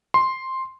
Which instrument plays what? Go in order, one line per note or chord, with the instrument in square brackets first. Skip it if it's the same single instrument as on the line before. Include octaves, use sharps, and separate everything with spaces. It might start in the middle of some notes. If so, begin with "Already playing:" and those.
[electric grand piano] C6